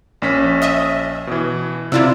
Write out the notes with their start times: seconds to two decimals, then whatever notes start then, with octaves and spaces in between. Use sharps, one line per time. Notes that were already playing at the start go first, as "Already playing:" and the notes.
0.22 A#1 C#4 B6
0.62 D#5 E5
1.27 B2 E3
1.92 C3 E4 F4 D5 E6